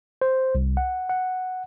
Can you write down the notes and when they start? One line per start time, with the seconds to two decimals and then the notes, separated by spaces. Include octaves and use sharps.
0.22 C5
0.55 C2
0.77 F#5
1.10 F#5